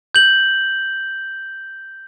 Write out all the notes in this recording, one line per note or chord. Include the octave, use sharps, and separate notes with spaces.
G6 F#7